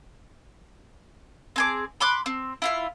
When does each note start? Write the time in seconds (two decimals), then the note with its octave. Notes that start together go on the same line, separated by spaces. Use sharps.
1.56 C4 G#4 D6
2.00 B5 C6 D6 F#6
2.26 C4
2.62 E4 F4 F5